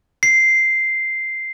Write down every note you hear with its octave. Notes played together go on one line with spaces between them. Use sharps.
C7